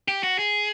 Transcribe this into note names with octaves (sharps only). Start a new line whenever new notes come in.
G4
F#4
G#4